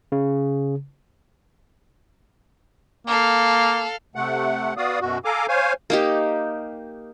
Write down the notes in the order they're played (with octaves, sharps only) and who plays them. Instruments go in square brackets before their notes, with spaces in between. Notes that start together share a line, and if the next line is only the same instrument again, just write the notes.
[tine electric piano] C#3
[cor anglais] A#3 [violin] A4 F5
[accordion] C3 A3 F#5
B3 F#4 D5 F5 D#6
F#2 B2 F#4
A4 F5 G#5 A#5 D6
C5 C#5 F5 G#5
[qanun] A#3 D#4 G4